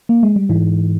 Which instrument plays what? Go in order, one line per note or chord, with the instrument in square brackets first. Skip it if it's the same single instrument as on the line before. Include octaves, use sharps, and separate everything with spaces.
[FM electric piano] A#3
G#3
G3
[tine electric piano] G#2 [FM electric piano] E3